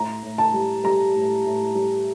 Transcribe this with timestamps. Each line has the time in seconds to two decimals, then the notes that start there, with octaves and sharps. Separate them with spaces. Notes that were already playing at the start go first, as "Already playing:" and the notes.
Already playing: A2 A#5
0.23 A2
0.38 A5
0.53 G3
0.84 G3 A#5
1.15 A2
1.45 A2
1.75 G3